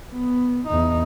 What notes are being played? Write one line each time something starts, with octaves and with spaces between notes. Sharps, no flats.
B3
E2 D#4